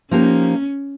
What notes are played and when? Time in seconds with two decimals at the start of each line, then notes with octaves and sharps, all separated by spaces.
0.11 F3 A#3 C#4 D#4 G4 A#4